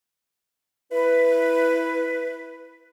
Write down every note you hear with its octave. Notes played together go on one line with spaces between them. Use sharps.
E4 B4